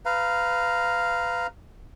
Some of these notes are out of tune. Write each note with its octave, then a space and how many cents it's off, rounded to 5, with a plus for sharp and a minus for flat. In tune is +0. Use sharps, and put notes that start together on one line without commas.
B4 +20 F5 -10 A#5 +0